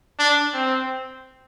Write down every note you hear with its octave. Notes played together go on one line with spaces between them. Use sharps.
D4
C4